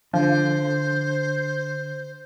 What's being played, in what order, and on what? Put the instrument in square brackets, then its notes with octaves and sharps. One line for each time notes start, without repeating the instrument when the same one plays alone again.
[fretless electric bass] D3 [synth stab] F3 [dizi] C5